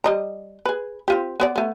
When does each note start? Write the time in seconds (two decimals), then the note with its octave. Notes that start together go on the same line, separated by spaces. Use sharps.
0.04 G3 D#5 A#5
0.66 G#4 B4
1.08 C4 F4 G4
1.40 B3 C4 D5
1.56 A3 B3